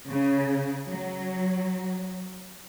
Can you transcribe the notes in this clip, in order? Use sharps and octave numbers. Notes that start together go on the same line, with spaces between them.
C#3
F#3